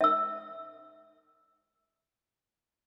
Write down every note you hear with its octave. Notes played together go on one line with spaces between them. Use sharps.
E5 E6